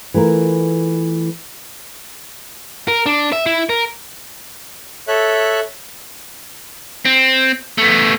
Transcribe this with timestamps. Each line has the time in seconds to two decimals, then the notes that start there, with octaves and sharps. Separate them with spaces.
0.14 E3 A3 F4 A#4
2.88 A#4
3.06 D4
3.32 E5
3.46 E4
3.69 A#4
5.08 A4 C#5 E5 F#6
7.05 C4
7.78 A3 B3